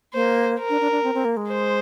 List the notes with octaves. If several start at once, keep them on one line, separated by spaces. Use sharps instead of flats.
A#3 C5
A#4
D4
D4
D4
C4
C4
A#3
G#3
C5